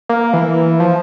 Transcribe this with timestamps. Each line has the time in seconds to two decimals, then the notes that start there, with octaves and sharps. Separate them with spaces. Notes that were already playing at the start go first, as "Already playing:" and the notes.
0.09 A#3
0.33 E3
0.80 F3